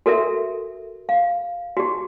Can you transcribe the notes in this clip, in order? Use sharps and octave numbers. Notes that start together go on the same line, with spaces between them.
F#4 A4 A#4 E5
F5
F#4 G4